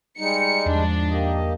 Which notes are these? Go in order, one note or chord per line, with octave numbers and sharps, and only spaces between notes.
G3 G#3 D#4 C#7
E2 G#2 F3 D4
A#3 G4 D#5